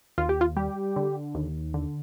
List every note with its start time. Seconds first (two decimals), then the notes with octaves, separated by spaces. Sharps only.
0.18 D#2 F4
0.29 G4
0.41 F4
0.56 G3 G4
0.96 D3
1.35 D#2
1.74 D3